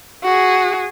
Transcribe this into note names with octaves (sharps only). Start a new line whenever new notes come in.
F#4 G#4